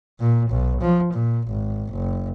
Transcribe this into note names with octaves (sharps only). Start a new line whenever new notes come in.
A#2
B1
F3
A#2
G#1
F#1